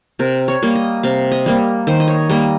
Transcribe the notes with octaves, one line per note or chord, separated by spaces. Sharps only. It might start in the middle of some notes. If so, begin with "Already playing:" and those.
C3 A#4
C#5
G3 A#3
D#5
C3 F5
D#5
G3 A#3
D#3 C5
D#5
C#5
G3 A#3 D#5